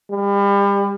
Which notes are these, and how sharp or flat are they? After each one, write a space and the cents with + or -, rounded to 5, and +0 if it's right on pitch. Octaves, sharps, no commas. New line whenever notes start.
G3 +35